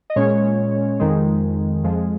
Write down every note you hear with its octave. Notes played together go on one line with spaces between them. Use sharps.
D#5
A#2 G#3 C#4 C#5
F2 D#3 G#3
F2 F3 G#3